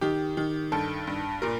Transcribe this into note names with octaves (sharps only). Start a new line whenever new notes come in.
D#3 G4
D#3
G2 A4
G2
A#2 A#4